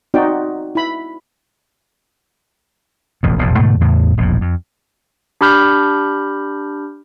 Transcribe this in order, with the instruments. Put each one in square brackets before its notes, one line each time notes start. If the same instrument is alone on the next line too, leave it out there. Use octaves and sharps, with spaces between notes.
[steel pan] C4 D#4 F#4 D5 G5
E4 B5
[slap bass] E1 A1 F2
E1 A#1 F2 A2
G#2 B2 D3 A3
E2 A2 C#3
E1 A#1 F2 A2
F2
[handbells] D4 G4 B5 F6 G6